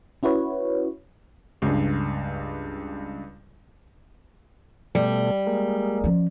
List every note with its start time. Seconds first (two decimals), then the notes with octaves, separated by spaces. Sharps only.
0.23 C#4 E4 F#4 B4 C#5
1.62 C#2 G2
4.95 B2 G3 A3
5.47 G#3 A#3
6.04 F3 C#4